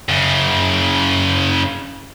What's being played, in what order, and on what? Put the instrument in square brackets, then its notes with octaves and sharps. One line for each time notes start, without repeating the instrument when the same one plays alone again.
[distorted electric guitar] F#2 C#3